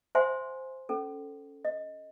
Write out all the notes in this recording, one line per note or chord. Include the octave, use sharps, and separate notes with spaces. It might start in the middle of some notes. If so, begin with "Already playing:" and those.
C5 E5 F#5 G#5 C6
C#4 A4
D#5